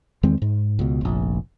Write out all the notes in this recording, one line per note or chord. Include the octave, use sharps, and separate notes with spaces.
E2 D#3 G#3 C4
G#2
C#2 B2
F1 A#1